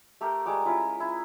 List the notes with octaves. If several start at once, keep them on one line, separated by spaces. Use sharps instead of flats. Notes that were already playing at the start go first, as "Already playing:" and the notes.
A3 G4 A4 A#4
G3 G#3 A#5 D6
C#4 E4 F4
E4